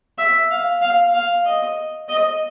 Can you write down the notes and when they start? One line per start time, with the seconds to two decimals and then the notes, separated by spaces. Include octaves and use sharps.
0.18 E5
0.50 F5
0.81 F5
1.13 F5
1.45 D#5
2.08 D#5